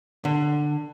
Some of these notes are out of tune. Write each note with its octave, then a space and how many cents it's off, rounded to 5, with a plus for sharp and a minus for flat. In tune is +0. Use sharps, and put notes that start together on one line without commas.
D3 +15